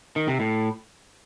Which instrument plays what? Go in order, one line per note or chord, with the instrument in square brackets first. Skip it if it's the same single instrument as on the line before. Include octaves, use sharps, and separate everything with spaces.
[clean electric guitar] D#3
C3
A2